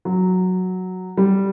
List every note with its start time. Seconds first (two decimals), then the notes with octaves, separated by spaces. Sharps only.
0.05 F#3
1.17 G3